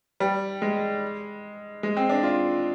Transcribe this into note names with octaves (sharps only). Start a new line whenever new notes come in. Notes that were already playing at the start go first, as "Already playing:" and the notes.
G3
G#3
G#3
C4
D4
F4